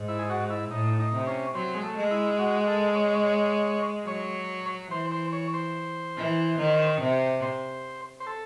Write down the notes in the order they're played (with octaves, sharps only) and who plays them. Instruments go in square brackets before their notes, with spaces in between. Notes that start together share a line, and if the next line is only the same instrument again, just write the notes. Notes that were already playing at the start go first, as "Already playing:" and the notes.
Already playing: [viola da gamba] G#2
[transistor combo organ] E4
G#4
F#4
E4
[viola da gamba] A2 [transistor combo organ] D#4
[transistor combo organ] D#4
[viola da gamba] C3
[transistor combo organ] C#4
[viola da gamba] F#3 [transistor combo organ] C4
[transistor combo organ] G#3
A3
[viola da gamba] G#3
[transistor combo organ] E4
F#4
A4
C#5
C#5
[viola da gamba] F#3 [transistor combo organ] C#5
[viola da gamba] E3 [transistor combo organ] C5
[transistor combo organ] C5
C#5
C5
[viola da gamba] E3
D#3
C3
[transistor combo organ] C5
C5
A4